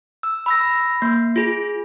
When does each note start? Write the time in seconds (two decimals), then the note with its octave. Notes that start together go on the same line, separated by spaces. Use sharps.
0.23 E6
0.46 B5 E6 A#6
1.02 A#3
1.36 F4 G#4